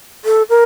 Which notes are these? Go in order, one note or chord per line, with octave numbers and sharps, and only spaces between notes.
A4
A#4